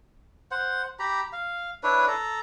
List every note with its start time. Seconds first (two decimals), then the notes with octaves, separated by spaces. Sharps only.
0.51 C5 F#5
0.99 G4 A#5 B5
1.33 F5
1.83 D4 E4 B4 C#5
2.08 A4 A#5